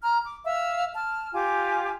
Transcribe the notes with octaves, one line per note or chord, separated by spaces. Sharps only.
A#5 F6
D6
E5 F5 E6
A5 F6
F4 G4 G#5 D6